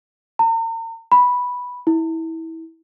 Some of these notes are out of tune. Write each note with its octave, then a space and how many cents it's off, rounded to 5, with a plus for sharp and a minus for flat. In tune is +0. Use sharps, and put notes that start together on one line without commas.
A#5 -40
B5 -5
E4 -25